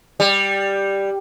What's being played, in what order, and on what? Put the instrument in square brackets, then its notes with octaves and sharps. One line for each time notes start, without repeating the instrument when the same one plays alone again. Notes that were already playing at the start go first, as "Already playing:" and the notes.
[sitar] G3